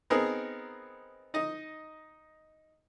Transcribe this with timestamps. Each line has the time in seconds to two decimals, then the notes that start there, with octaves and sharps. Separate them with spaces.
0.10 B3 C4 D#4 G#4 A#4
1.34 D#4 D#5